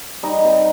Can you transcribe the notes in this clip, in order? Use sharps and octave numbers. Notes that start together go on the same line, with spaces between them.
G3 D#4 D#5
C3